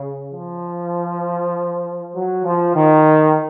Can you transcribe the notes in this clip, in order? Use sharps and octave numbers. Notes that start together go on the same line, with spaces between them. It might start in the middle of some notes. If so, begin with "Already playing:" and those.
Already playing: C#3
F3
F#3
F3
D#3